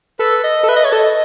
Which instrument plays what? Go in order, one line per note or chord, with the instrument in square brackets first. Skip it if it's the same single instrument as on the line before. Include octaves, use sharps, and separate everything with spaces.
[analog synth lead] A4 [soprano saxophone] B4
[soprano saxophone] D#5
[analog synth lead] A4
[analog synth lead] B4 [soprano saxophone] E5
[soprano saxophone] D#5
C#5
[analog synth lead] A4 [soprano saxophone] D#5